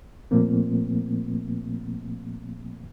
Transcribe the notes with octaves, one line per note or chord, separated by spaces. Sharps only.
A#2 F3 A3 A#3 C4